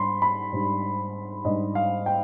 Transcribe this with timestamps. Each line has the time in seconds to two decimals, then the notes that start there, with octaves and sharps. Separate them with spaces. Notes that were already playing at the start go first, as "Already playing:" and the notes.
Already playing: G#2 G3 D4 B5 C6
0.22 B5
0.53 G#2 G3 D4
1.45 G#2 G3 D4 D#5
1.75 F5
2.06 G5